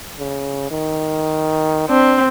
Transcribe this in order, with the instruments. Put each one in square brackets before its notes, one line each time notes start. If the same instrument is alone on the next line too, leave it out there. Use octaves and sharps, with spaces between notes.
[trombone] C#3
D#3
[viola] C4 [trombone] D4